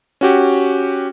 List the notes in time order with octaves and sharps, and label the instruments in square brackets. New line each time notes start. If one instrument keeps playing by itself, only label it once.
[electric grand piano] C#4 F#4 G4